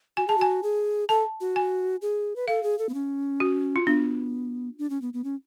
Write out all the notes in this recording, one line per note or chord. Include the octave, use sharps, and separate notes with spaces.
F#4 G#5
G#4 A5
F#4 G#5
G#4
A4 A5
F#4
G#5
G#4
B4
A4 F5
G#4
A4
B3
C#4
F#4
F4
B3 D4
D4
C#4
B3
B3
C#4